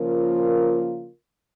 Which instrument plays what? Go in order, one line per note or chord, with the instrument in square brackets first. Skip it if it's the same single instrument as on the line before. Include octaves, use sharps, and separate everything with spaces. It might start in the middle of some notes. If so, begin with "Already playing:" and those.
Already playing: [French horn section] C#3 F3 A#3 F4 A#4